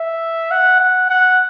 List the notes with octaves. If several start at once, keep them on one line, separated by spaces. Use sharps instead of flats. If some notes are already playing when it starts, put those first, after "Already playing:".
Already playing: E5
F#5
F#5
F#5